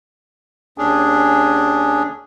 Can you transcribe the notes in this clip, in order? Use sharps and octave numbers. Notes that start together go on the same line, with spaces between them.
D#2 C#4 D4 G#4